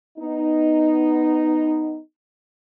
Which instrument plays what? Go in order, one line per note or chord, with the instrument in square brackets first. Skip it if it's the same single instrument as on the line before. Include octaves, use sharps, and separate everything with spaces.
[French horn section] B3 D#4